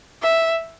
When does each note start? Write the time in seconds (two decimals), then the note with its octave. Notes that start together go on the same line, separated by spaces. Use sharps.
0.23 E5